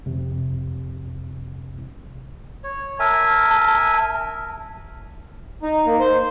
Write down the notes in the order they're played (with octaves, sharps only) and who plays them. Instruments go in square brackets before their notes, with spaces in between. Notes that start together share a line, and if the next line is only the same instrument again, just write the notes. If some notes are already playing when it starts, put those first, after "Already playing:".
[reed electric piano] F2 C3
[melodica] C#5
[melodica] A#4 E5 G#5 [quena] A5
[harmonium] D#4
A#3
C5